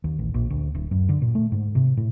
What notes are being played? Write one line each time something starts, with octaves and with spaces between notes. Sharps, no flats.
D#2
A1
A#1
D2
D1
F#2
D3
A#2
A3
G#2
C3
A2